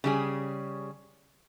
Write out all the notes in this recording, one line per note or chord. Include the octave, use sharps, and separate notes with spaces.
C#3 G3 G#4